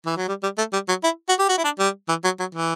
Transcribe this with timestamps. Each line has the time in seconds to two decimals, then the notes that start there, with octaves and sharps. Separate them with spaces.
0.06 E3
0.17 F#3
0.28 G3
0.43 G3
0.58 A3
0.73 G3
0.88 F#3
1.04 E4
1.29 F#4
1.39 G4
1.49 F#4
1.58 E4
1.64 D4
1.79 G3
2.09 E3
2.24 F#3
2.40 F#3
2.55 E3